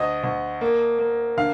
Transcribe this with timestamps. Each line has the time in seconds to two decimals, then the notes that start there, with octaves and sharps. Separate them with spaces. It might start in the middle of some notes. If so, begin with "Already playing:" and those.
Already playing: D2 D#5
0.24 D2
0.61 A#3
0.99 A#3
1.37 D3 F5